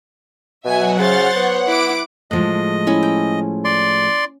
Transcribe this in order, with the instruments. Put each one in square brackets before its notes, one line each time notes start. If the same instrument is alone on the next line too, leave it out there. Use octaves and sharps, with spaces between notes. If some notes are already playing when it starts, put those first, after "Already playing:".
[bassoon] B2 [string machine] F#3 F#5 [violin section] E5 G#5
[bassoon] C#3 [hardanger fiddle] C5 [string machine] F#5 [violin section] F6 A6
[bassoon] B3 [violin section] C#5
[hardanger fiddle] E4 [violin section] D6 D7
[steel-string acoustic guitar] A2 F3 G#3 [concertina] D#5
[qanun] C#4 E4 C#5
G5
[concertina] D5 C6